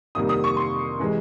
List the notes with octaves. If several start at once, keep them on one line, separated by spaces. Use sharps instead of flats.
F2 C3 D#3 G3 A#3 D#6
D#6
C#6
C6
C3 E3 G#3